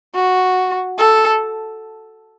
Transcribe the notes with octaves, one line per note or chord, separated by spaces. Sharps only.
F#4
A4